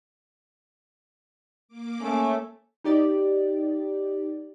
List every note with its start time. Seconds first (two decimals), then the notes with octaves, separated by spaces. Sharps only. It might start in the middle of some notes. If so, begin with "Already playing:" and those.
1.68 A#3 D6
2.00 A3 C#4
2.84 D#4 G4 D5